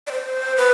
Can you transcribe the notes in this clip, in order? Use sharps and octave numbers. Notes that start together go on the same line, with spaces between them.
D5
C5
B4